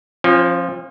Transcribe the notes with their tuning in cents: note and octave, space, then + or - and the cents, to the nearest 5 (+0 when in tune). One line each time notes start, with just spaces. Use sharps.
F3 +0 C#4 -45